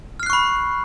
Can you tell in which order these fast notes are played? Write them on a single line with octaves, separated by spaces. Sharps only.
F6 C7 F#6 C#6 B5